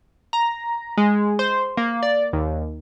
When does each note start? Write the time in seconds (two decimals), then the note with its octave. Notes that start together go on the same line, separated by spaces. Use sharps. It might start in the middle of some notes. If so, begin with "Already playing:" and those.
0.33 A#5
0.97 G#3
1.39 C5
1.77 A#3
2.03 D5
2.33 D#2